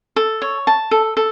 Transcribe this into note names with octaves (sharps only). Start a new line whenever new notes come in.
A4
C#5
A5
A4
A4